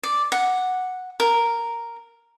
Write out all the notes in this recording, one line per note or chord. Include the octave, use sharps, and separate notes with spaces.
D5
F#5
A#4